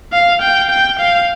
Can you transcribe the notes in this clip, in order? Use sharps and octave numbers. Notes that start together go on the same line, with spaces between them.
F5
G5
G5
F5